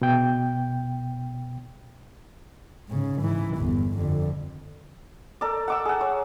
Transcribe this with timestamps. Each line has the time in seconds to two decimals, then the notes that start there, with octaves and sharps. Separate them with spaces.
0.01 B2 G5
2.89 G#2 C#3
3.19 G#2 E3
3.56 G1 E2
3.98 F2 D3
5.41 A4 A#4 D5
5.68 F#5 D6 E6
5.85 G#4 F#5
6.01 C#5